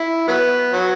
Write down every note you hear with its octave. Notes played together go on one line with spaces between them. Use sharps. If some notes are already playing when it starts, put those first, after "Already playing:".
Already playing: E4
F#3 B3
F#3